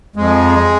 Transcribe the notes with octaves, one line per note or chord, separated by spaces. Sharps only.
F2 G#3